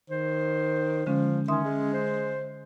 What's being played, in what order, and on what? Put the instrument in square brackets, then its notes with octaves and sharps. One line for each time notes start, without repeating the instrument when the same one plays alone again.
[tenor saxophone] D#3 [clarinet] C5
[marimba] D3 G#3 C#4 [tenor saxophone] F3
[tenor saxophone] D#3 [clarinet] C#4 [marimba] E5 C6 D#6
[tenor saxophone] G#3
[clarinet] C5